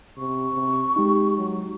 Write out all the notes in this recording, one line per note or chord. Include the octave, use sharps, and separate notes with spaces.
C3 C#6
C3
G#3 D#4 G4
F#3